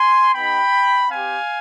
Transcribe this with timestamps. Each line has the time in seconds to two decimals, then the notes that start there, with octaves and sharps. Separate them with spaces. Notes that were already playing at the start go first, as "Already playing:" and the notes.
Already playing: G#5 C6
0.34 B3 D#4 G4 G5 B5
1.11 C4 G4 F5 G#5